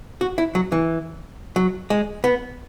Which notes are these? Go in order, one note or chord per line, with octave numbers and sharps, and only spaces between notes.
F#4
E4
F#3
E3
F#3
G#3
B3